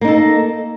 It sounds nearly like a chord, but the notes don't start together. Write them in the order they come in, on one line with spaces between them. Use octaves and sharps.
A#3 D#4 A4